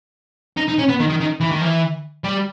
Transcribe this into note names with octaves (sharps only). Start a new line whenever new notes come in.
D#4
D#4
C#4
B3
D#3
D#3
D#3
E3
D#3
E3
G3